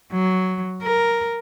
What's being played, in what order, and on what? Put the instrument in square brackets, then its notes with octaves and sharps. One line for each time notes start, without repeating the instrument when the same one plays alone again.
[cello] F#3
A#4